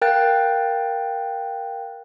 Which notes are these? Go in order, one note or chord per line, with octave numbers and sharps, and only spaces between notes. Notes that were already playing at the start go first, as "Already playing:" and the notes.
A#4 F5 G5 F#6 A6